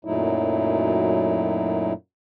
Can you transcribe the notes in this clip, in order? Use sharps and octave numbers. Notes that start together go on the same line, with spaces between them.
F#2 A#2 F#3 A3 D#4 E4